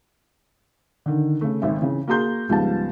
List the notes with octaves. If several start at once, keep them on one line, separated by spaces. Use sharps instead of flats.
D3 D#3
C#3 A3
G#1 E5
C#3 E3
A#3 F#4 G#4 A#5 C6 G6
C#2 G#2 F3 G3 B3 A5